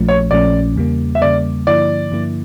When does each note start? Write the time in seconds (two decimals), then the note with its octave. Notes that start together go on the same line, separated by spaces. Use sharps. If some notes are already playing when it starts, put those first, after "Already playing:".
Already playing: A#1 A#2 F3 A3 C#4
0.09 C#5
0.31 A#1 A#2 F3 A3 C#4 D5
0.76 E2 C#3 G3 A#3
1.15 E5
1.21 E2 C#3 G3 A#3 D5
1.67 G2 D3 F3 A#3 E4 D5
2.12 G2 D3 F3 A#3 E4